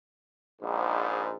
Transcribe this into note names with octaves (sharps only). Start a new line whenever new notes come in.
A#1 G#2